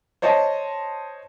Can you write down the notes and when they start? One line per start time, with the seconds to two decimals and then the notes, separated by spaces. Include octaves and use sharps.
0.22 C5 C#5 D#5 A5